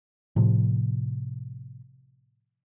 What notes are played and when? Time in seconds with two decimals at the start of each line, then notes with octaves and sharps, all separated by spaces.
0.36 A2 C3 F3